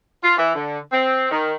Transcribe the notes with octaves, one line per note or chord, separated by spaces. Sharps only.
F4
E3
D3
C4
D#3